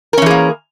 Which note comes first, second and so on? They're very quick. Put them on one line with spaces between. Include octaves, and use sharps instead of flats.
A#4 C#4 E3 G#4 A#3